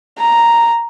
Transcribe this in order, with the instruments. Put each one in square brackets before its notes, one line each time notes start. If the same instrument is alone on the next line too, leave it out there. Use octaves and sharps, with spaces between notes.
[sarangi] A#5